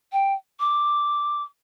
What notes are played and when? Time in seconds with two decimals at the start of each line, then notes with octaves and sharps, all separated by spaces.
0.12 G5
0.60 D6